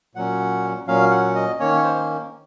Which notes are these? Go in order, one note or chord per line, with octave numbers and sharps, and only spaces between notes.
A#2 F#3 C#4 F#5
A#2 F#3 C#4 F5
F#5
D#5
D#3 A#3 C#4 C#5
C5